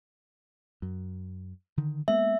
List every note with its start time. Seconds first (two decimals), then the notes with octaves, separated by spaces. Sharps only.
0.82 F#2
1.77 D3 D#3
2.08 G#3 A#3 B3 E5